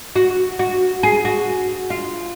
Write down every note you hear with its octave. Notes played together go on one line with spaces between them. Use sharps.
F#4
F#4
G#4
F#4
F4